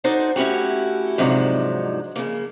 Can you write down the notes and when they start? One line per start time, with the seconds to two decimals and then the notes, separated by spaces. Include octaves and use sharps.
0.04 D#4 F#4 A4 C5 D5
0.36 A2 C#4 E4 F#4 G4
1.18 G#2 C3 F3 F#3 D4 D#4
2.16 C#3 F3 A#3